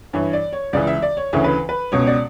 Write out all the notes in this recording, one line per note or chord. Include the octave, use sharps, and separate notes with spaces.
G2 E3 C#5
D5
C#5
C#2 C#3 E3 D5
E5
D5
C#5
D2 C#3 E3 C#5
B4
B4
C#2 B2 C#5
D5